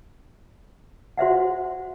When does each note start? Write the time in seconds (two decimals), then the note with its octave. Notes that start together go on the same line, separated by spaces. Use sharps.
1.18 F#4 C5 E5 F#5